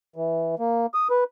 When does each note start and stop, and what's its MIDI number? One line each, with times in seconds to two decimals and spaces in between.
0.16 0.55 52
0.59 0.86 58
0.94 1.08 87
1.10 1.24 71